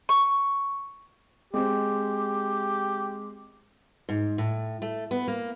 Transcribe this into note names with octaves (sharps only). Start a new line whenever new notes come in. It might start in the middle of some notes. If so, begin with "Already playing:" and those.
C#6
G#3 C4 G4
G#2
A2
A3
B3
A#3